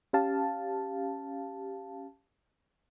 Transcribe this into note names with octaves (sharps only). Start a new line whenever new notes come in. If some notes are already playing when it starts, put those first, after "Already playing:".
C#4 G4 F5 A5